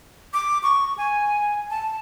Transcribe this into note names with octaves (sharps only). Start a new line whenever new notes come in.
D6
C#6
G#5
A5